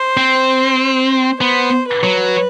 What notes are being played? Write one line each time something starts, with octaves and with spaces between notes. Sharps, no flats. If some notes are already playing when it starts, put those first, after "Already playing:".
Already playing: C5
C4
B3 C5
B4
F#3